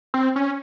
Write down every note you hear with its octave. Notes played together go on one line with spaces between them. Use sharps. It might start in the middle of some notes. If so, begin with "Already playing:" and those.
C4
C#4